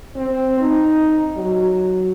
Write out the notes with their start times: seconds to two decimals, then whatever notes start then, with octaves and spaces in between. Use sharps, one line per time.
0.16 C4
0.61 D#4
1.37 F#3